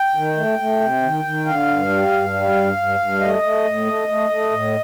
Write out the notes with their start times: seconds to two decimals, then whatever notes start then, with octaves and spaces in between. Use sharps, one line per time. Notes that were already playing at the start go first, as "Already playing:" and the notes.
Already playing: G5
0.15 D#3
0.37 A3
0.59 A3
0.80 C3
1.02 D#3
1.24 D#3
1.46 D3 F5
1.67 G2
1.90 G3
2.12 G2
2.33 G3
2.55 G2
2.77 G2
2.99 G2
3.20 A3 D#5
3.42 A3
3.64 A2
3.86 A3
4.08 A3
4.30 A3
4.52 A2